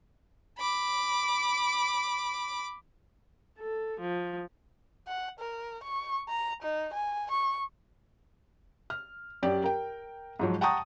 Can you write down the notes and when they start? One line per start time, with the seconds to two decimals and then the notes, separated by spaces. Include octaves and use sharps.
0.59 B5 D6
3.60 A4
4.00 F3
5.07 F#5
5.39 A#4
5.83 C#6
6.28 A#5
6.62 D#4
6.93 G#5
7.31 C#6
8.90 F6
9.43 F#2 G4 D5
9.64 A#4 G5
10.39 G#2 F3 F#3
10.61 F#5 G5 A5 A#5 C#6 D#6